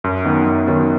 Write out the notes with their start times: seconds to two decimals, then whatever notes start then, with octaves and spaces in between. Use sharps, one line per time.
0.04 F#2
0.25 D#3 F#3 B3
0.45 F#2
0.67 D#3 F#3 B3